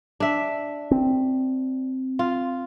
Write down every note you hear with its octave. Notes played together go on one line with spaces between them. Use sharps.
D4 E5
C4
F4